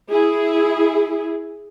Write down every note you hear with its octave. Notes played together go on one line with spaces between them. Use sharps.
E4 G#4